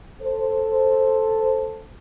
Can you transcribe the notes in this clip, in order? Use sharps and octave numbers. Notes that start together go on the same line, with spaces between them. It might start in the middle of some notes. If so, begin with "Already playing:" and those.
A4 C5